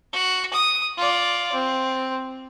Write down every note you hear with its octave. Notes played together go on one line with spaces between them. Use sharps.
F#4
D#6
F4 D5
C4